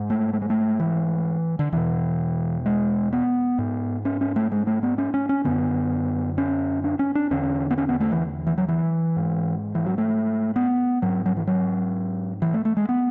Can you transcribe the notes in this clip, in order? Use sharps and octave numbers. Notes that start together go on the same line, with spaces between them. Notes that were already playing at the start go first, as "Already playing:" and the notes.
Already playing: G#2
A3
A3
G#3
A3
E3
D3
E2 B2 E3
G#3
B3
G#2
C#4
C#4
A3
G#3
A3
B3
C#4
C#4
C#4
F#2 D3 B3
C#4
D4
C#4
D4
E2 D3 C#4
B3
C#4
B3
A3
E3
E3
F#3
E3
G#2
E3
F#3
A3
B3
G#2 F#3
F#3
E3
F#3
E3
A3
A3
G#3
B3